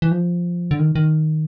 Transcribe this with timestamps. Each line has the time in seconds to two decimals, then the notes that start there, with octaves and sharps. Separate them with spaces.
0.02 E3
0.11 F3
0.71 D3
0.79 D#3
0.95 D#3